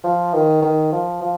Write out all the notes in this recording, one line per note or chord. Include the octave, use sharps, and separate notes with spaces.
F3
D#3
D#3
F3
F3